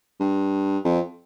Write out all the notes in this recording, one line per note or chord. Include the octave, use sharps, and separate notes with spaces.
G2
F2